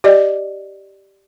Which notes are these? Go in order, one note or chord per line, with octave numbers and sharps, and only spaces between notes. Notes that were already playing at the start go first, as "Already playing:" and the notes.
G4 D5 D#5